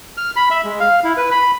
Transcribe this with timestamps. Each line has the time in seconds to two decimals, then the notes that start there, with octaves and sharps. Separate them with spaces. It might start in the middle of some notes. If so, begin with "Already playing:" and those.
0.17 F6
0.36 B5
0.51 E5
0.64 G#3
0.80 F5
1.04 E4
1.17 B4
1.31 B5